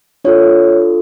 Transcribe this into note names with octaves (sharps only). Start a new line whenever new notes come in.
D4 F4 A4 C#5